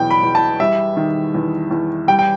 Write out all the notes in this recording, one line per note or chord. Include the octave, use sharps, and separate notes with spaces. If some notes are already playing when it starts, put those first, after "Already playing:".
Already playing: E2 B2 F#3 G5
B5
E2
A5
G3 E5
D#3
E2
E2
G3 G5
G5